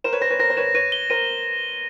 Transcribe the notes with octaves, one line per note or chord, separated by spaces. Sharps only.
A#4 C5 E7
B4 C#5
A#4 C5 A#6
B4 C#5
A#4 C5 A#6
C5
B4 C#5 E7
B4 C#5 D#7
G7
A#4 C5 D#7